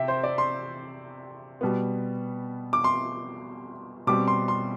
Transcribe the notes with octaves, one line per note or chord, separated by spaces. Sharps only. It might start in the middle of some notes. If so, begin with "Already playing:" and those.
Already playing: C3 E5 G5
C5
D5
C6
B2 G3 B3
D6
C6
B2 G3 C4 D6
C6
C6